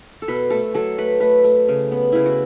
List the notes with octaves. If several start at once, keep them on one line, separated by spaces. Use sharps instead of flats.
A4
B2 B4
A3 A4
F#3 A4
A3 B4
A3 B4
A3
C#3
B3
C#3 E4
F#4